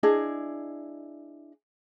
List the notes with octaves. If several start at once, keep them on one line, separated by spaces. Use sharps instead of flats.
D4 E4 G#4 D#5